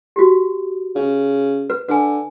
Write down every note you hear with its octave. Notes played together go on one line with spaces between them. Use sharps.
F#4 G4
C#3
B4
D3 B4 G#5